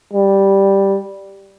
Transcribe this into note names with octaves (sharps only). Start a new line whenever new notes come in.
G3